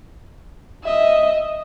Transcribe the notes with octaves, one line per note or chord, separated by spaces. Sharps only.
D#5 E5